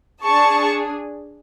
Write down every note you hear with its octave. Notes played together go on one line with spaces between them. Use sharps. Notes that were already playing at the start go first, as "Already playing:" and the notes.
D4 G#4 A5 C#6